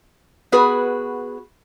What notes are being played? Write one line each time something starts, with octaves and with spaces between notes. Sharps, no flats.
B3 F#4 G#4 B4